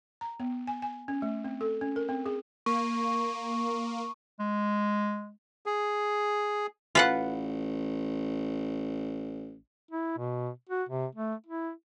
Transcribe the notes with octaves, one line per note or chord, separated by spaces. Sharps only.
A#5
B3
G#5
G#5
C#4
A3
C4
A4
C#4
A#4
C4
G#4
A#3 C#6
G#3
G#4
A1 F4 B4 F#5
E4
B2
F#4
C3
A3
E4